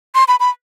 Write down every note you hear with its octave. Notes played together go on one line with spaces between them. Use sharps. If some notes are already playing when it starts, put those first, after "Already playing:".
C6
B5
B5